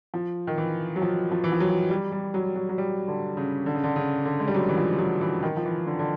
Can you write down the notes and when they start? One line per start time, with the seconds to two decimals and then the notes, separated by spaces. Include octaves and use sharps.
0.14 F3
0.47 D#3
0.58 E3
0.96 F#3
1.02 F3
1.31 F3
1.44 E3
1.52 F3
1.60 F#3
1.90 G3
2.12 G3
2.34 F#3
2.56 F#3
2.69 F#3
2.78 G3
3.08 D3
3.37 C#3
3.66 D3
3.75 C#3
3.84 D3
3.96 C#3
4.25 D3
4.40 G#3
4.47 G3
4.54 F#3
4.69 E3
4.77 F3
4.99 F#3
5.21 E3
5.43 D#3
5.57 F3
5.65 E3
5.87 D3
5.99 D3